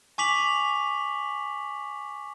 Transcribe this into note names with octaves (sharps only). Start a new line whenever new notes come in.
G#5 C#6 D6 B6 F7 F#7